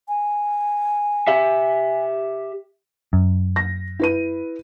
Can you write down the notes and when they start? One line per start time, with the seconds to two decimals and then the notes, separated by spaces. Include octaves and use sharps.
0.08 G#5
1.27 G4 E5
3.13 F#2
3.56 A#6
3.99 E4 B4 D#7